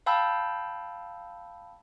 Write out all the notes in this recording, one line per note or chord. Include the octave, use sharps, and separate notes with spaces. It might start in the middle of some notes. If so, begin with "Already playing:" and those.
F5 G5 A5 B5 E6 G6